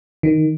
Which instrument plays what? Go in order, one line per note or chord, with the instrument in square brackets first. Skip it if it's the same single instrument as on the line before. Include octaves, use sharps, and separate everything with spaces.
[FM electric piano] D#3